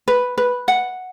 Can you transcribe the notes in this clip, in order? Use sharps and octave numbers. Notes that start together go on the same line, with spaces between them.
B4
B4
F#5